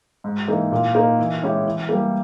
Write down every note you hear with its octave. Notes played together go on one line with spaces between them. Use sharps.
G#2
E3 A#3 D#4
A#2
A#3 D#4
E3
G#3 C#4 E4 G4
E3
G3 A#3